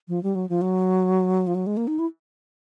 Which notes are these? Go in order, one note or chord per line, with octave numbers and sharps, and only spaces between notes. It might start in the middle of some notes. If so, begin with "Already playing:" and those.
F3
G3
F#3
F3
F#3
F3
F#3
G#3
A#3
D#4
E4